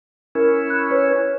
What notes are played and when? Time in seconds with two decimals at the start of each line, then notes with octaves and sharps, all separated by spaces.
0.35 C#4 E4 A#4
0.70 F#6
0.91 B4 C#5